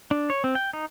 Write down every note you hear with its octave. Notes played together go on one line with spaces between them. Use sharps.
D4
C#5
C4
G5
D#4